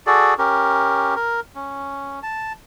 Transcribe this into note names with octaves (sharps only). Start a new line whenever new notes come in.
F#4 G#4 A4 D5
C#4 G4 A#4
A#4
C#4
A5